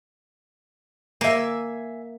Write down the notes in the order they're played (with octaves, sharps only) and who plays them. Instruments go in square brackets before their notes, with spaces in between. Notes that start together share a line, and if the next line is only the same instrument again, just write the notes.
[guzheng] A#3 [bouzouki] E5 G#5